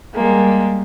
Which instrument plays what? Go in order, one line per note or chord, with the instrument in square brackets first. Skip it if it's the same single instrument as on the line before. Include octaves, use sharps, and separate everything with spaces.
[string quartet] G3 G#3 A#3